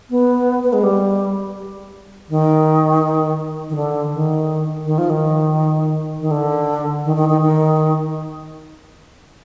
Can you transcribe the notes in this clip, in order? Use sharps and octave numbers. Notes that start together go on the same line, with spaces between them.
B3
B3
G#3
G3
D#3
D#3
D3
D#3
D#3
F3
D#3
D#3
D3
D#3
D#3
D#3
D#3